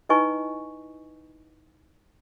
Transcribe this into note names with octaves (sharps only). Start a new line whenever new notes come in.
D#4 E4 B4 D#5 G#5 C#6